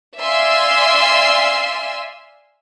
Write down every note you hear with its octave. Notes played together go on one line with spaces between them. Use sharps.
D5 E5 F5 G#5 C6 E6